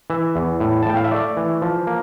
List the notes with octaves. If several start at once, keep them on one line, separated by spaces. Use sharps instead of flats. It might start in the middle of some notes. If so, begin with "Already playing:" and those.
E3 E5
E2
A2
A5
A2 G5
F5
E5
A3 D5
E3
F3
A#3